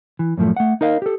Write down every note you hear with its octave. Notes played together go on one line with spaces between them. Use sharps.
E3
F#2 A2 F3 A3
A3 F#5
D#4 A#4 D#5 F5
G4 A4